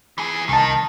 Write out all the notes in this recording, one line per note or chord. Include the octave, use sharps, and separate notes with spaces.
E3 G#4
C2 D#3 D#4 A5